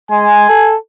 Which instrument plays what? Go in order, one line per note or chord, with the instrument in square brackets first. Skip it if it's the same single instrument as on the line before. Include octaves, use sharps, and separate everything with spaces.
[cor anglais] G#3 [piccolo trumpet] G#5
[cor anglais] A4